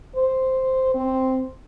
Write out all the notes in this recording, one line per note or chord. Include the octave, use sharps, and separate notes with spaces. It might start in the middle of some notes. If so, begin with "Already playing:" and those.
C5
C4